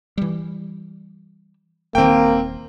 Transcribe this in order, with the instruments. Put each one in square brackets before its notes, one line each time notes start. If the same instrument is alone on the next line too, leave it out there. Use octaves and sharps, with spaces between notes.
[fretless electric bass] E3 G3
[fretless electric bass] D#1 D#3 [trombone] A#3 [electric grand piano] C4 G5